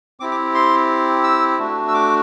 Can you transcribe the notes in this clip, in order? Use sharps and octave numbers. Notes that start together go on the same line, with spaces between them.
C4 E4 G4 D6
D6
C6
E6
A3 D4 F#4
E6
D6